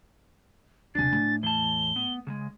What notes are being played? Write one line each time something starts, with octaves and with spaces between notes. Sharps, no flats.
D#1 C3 D4 G#5 A6
A2
E2 A5 G7
B3
C#3 G3 G#3